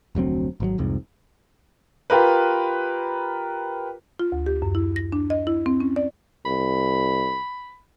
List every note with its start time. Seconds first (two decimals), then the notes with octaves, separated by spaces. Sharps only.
0.15 F1 D2 F#3 C4
0.60 G#1 B2 F#3
0.78 F1 C2 F2 G#2
2.10 F4 G4 A#4 B4
4.19 F4
4.32 D2
4.46 G4
4.62 F#2
4.75 E4
4.96 A#6
5.12 D4
5.30 D#5
5.47 E4
5.66 C4
5.80 C#4
5.96 D5
6.46 C2 B5